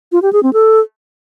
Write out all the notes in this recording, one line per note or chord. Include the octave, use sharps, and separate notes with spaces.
F4
G4
G#4
C4
A4